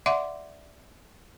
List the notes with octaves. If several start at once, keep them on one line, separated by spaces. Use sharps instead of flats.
D5 E5 F#5 C6 D6